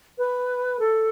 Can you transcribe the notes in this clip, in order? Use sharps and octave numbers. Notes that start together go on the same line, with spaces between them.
B4
A4